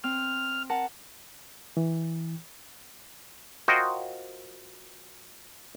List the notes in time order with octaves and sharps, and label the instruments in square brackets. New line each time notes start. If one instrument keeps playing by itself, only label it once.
[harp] C4 [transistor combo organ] F6
[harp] A#4 F#5 A5
[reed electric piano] E3
[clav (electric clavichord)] F4 F#4 A#4 C5 D#5 G5